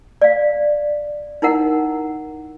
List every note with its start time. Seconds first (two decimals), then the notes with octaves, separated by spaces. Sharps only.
0.22 D5 F5
1.42 D#4 E4 A#4 F#5